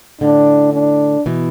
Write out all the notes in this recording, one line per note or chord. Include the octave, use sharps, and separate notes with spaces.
A2 D3 D4
D4
B2 E3